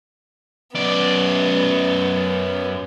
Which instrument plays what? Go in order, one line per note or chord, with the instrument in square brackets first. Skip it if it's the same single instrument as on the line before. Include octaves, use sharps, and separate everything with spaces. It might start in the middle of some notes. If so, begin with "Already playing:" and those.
[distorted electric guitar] F#2 D5 [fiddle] B3